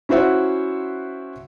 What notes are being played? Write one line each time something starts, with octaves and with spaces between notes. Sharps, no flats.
C#4 E4 F#4 C5 E5 F#5